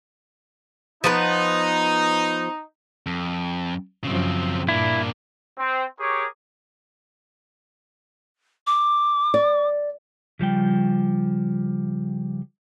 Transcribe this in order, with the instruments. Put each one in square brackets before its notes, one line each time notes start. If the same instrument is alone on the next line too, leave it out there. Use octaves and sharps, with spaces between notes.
[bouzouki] F3 B3 B4 [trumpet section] D#4
[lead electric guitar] F2
[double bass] F#2 F3 [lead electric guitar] C#3 C4
[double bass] G2 A#2 [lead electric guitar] A#3 D4 [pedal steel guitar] E4
[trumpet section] C4
G4 G#4 A#4 C#5 C#6 D6
[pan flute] D6
[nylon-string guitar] D5
[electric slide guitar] C#3 F3 G3 G5